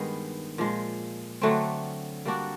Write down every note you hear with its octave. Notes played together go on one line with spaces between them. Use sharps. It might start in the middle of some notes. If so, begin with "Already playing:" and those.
Already playing: G2 D#3 G#3 B3
A#2 F3 G#3
D3 F#3 A3 C4
G3 A#3 D4 F#4